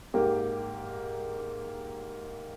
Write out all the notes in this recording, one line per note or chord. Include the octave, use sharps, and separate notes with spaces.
G#2 A#3 G4